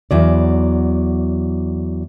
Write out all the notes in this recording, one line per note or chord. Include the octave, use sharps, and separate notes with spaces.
E2 F#3 D5